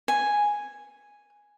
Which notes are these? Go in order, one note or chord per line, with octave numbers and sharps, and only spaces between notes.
G#5